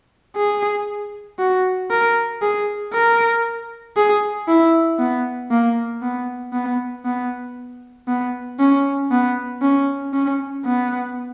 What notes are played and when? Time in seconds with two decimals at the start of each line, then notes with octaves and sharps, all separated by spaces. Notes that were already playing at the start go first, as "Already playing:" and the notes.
0.36 G#4
1.39 F#4
1.91 A#4
2.42 G#4
2.93 A#4
3.97 G#4
4.48 E4
4.99 B3
5.51 A#3
6.02 B3
6.53 B3
7.05 B3
8.08 B3
8.60 C#4
9.11 B3
9.62 C#4
10.13 C#4
10.65 B3